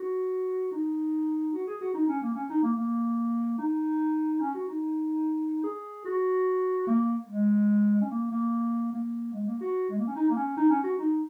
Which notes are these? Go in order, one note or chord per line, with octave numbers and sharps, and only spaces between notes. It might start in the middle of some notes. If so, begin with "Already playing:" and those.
Already playing: F#4
D#4
F#4
G#4
F#4
D#4
C#4
A#3
C#4
D#4
A#3
A#3
D#4
C#4
F#4
D#4
G#4
F#4
A#3
G#3
C#4
A#3
A#3
A#3
G#3
A#3
F#4
G#3
A#3
C#4
D#4
A#3
C#4
D#4
C#4
F#4
D#4